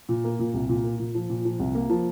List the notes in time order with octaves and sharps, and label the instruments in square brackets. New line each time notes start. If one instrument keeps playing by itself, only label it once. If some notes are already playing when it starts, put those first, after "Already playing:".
[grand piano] A#2
A#3
A#2
C2
A#2
A#3
A#2
F3
A#2
F3
C2
A#3
F3